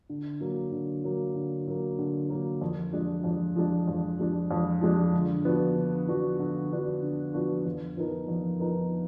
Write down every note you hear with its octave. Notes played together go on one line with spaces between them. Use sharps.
D3
F#3 A#3
D3
F#3 A#3
D3
F#3 A#3
D3
F#3 A#3
F2
F3 G#3 D4
F2
F3 G#3 D4
F2
F3 G#3 D4
F2
F3 G#3 D4
D3
F3 B3 D4 F#4
D3
F3 B3 D4 F#4
D3
F3 B3 D4 F#4
D3
F3 B3 D4 F#4
F2
F3 B3 D#4 A#4
F2
F3 B3 D#4 A#4